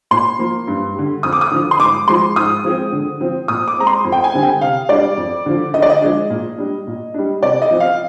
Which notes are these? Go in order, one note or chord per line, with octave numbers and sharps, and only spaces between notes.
A#2 C6
F3 A#3
G2
D3 G3
F2 D#6
D6
D#6
D3 F3
C6
G#2 D6
F3 G#3 C6
G#2 D#6
F3 G#3 C4
D3
F3 C4
A#2 D#6
D6
G#3 C4 A#5
C6
F2
G5
G#5
D3 G3 C4
G5
C3 F5
G3 D4 D5
F2
D3 F3
D3 D#5
D5
D#5
F3 G#3 D4
A#2
G3 D4
A#2
G3 D4
C3 D5
D#5
F3 C4
F5